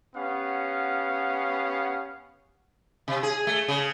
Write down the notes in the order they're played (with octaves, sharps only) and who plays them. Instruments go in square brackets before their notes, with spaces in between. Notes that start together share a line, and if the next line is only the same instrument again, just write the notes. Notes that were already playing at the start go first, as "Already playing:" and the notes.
[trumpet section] B3 C#4 G4 F5 F#5
[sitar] C3
G#4
A3
C#3